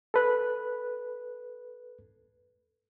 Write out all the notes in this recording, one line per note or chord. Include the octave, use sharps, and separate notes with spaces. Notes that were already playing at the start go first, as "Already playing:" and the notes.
A4 B4 F#6